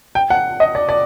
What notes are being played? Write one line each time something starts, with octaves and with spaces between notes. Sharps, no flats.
G5
F#5
D#5
D5
D5